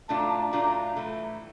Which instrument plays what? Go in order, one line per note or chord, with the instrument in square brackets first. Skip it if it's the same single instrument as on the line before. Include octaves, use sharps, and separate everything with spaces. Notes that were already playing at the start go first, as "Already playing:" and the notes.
[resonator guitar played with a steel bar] A2 F#3 A3 D4 F4 [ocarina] A5
[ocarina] A#5
A5
[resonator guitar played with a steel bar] A2 F#3 A3 D4 F4 [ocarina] A#5
[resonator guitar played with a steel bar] A2 E3 A3